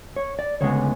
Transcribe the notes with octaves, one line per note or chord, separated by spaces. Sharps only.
C#5
D5
D2 C#3 G#3 B3 C#5